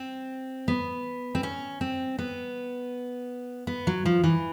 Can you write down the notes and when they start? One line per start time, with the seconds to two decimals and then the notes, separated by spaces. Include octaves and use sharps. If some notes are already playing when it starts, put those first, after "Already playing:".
Already playing: C4
0.68 B3
1.35 C4
1.43 C#4
1.81 C4
2.19 B3
3.67 B3
3.87 F#3
4.05 F3
4.24 E3